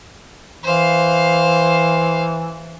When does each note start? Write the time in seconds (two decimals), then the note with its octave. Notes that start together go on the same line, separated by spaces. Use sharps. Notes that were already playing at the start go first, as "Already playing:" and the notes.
0.64 E3 C5 F5